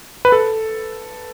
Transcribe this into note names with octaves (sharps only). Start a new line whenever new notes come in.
B4
A4